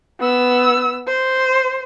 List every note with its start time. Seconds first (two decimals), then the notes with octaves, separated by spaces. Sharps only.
0.20 B3 E6
1.07 C5